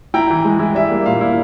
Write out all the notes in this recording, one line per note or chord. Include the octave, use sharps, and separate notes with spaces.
E4 G5 A#5
E3
G#3
E4
G3 E5
A#3
A#2 F5
E4